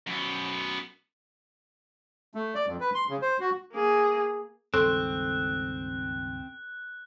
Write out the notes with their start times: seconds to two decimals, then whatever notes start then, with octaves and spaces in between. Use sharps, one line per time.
0.07 F#2 B3
2.35 A3
2.55 D5
2.67 F2
2.80 B4
2.95 C6
3.09 C#3
3.22 C5
3.40 F#4
3.73 A#3 G#4
4.74 C#2 G2 D#3 C4 A4 C6 C#6 F#6